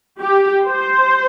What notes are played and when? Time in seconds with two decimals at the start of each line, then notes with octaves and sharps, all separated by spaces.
0.20 G4
0.65 C5